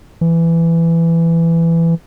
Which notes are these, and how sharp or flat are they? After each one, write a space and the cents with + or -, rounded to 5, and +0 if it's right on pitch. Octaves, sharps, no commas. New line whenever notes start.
E3 +15